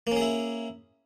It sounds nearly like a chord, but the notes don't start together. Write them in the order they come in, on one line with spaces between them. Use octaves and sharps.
A#3 C#4 G#4 E4